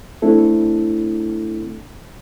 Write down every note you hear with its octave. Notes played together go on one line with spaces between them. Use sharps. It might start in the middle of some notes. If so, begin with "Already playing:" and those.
A3 C4 D4 E4 A4